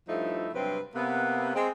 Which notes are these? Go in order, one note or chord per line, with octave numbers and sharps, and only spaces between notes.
G2 F3 A3 D#4 E4
G2 C3 F#3 C4 B4
C3 A#3 B3
G#3 C4